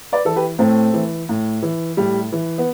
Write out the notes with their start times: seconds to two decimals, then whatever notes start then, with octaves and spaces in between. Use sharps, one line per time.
0.12 B4 D5
0.25 E3 A4
0.36 G4 B4
0.59 A2 A3 C4
0.94 E3
1.29 A2
1.63 E3
1.97 A2 G3
2.32 E3
2.58 B3